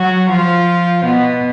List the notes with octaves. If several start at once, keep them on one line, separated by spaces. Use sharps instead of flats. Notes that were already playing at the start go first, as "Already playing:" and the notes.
Already playing: F#3 F#4
F3 F4
B2 B3